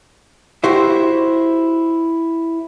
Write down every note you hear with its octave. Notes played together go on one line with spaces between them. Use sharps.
E4 F#4 G4 C5 E5